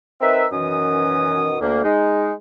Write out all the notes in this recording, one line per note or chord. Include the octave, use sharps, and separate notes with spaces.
C4 D#4 A#4 B4 E5
F#2 B2 D#3 E3 C#4 D#6
D2 A#3
G#3 D#4